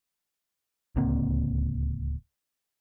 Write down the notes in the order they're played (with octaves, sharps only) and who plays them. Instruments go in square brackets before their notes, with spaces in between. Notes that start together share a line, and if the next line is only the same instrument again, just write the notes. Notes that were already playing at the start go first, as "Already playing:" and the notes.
[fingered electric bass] D1 C#2 A#3 C4